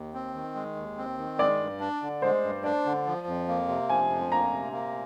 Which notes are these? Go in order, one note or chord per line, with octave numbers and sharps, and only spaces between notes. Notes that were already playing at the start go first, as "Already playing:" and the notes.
Already playing: D#2
C4
D#3
G#3
D#2
C4
D#3
G#3 D5
G2
D4
D3
G#3 C5
G2
D4 D5
D3
F3
F2
A#3
C3
F3 G#5
F2
A#3 A#5
C3
A#3